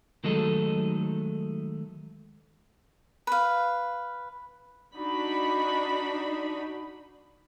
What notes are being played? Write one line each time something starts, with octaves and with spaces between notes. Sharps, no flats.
D#3 F#3 G#3 A3 D#4 A4
B4 F5
D4 D#4 F#4 B5